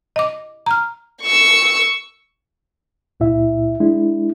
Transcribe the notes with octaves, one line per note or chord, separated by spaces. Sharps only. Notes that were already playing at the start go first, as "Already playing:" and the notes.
D#5 D6
A#5 F6
C#6 E6
C#2 A#2 E4 E5
G#3 D4 E4